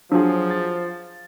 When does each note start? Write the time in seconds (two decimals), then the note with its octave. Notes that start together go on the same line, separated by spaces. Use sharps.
0.12 F3 F#3 D4 F4 G#4
0.50 A6